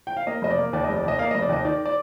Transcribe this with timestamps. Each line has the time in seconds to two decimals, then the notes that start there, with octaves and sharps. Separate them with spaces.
0.07 G5
0.17 F5
0.27 A#3 D#5
0.42 F1 D#5
0.51 D5
0.58 A#3
0.73 D#2 D5
0.84 D#5
0.89 F1
0.97 D5
1.03 D#2
1.08 D#5
1.18 A#3 D5 F5
1.31 D#5
1.35 F1
1.42 D5
1.49 D#2 D#5
1.65 D#3 D5
1.86 D5